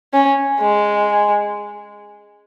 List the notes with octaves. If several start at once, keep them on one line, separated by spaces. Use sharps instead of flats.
C#4
G#3